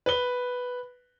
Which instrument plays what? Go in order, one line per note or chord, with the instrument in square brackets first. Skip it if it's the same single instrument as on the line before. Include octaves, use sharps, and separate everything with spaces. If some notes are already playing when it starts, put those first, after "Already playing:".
[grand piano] B4 G7